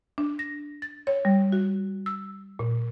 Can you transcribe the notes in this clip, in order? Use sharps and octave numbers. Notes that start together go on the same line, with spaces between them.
D4
A#6
A6
C#5
G3
F#4
E6
A#2